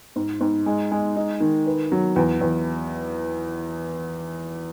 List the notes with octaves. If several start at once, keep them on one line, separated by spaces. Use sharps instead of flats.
G#2
G#2
G#3
G#3
D#4
D#3
B4
F#3
E2
E2